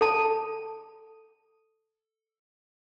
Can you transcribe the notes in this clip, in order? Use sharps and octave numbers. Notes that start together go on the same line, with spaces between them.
A4 A5